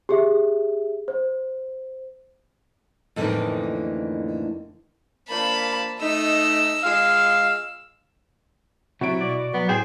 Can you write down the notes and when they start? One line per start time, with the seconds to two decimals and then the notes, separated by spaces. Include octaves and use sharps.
0.09 G4 G#4 E5
1.08 C5
3.16 F2 A2 D3 E3 A#3 D#4
5.29 F3 A#3 D4 A5 B5
6.00 A3 D#4 D#5 E6
6.83 G#3 F4 D#5 F5 E6
9.01 C3 F#3 E4 F#4 D7
9.21 B2 D5
9.54 F#3 B3
9.69 A2 G#4 C5 G5